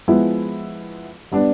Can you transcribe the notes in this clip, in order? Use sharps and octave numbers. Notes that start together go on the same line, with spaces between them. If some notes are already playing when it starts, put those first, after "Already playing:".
F3 G#3 B3 E4
G3 B3 D4